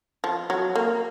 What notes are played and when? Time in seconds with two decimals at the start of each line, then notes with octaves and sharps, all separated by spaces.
0.24 F3
0.50 F#3
0.75 A#3